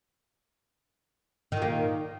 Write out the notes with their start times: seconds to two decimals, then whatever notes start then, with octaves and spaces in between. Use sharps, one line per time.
1.52 D#3
1.57 A#2
1.62 A#3